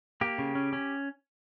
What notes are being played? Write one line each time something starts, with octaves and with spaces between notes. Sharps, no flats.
A#3 G4
C#3
C#4
C#4